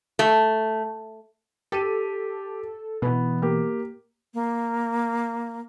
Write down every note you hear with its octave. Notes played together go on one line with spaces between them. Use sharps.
A3
G4 A4 D#7
B2 E3 B3
A#3 G4
A#3